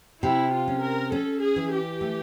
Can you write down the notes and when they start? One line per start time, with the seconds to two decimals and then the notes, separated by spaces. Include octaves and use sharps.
0.23 C3 E4
0.52 F4
0.68 C#4
0.82 A#4
1.12 C#4 A4
1.42 G#4
1.56 E3
1.72 G4
2.01 A3